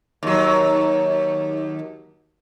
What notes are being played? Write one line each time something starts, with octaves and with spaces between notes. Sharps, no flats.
D#2 F#3